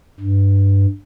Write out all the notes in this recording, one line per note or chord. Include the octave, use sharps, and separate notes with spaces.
G2